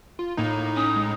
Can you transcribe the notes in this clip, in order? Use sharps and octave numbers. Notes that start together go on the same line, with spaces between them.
F4
A2 A#3 D#4
C#4 D#6
G#3